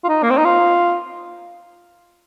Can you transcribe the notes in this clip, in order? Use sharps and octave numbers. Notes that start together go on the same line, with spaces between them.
F4
D#4
A#3
C4
D#4
F4